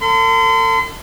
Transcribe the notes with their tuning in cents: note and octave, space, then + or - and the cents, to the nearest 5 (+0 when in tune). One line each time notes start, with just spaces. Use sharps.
A4 +40 C6 -40